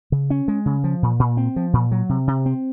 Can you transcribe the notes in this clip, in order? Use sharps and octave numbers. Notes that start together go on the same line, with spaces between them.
C#3
C#4
G#3
C#3
F3
A#2
A#2
C4
F3
A#2
F#3
C3
C3
C4